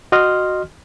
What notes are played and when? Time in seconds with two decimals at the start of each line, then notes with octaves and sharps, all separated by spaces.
0.12 F#4 D#5 C6 F6